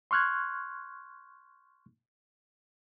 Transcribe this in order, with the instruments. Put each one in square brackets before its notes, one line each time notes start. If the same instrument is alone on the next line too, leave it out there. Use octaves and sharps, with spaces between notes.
[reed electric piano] C6 C#6 F6 F#6 G#6